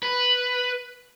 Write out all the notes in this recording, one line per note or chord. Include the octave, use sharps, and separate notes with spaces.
B4